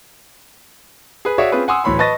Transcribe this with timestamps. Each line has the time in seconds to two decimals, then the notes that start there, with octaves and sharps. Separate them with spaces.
1.25 G#4 B4
1.38 F#4 G#4 C#5 D5 E5 F5
1.52 C4 C#4 F4 G#4 B4
1.68 F#5 G#5 C6 D#6 E6
1.84 D1 A2 E3 C#5 B5 C6
1.99 B4 D#5 A5 C#6 A6 A#6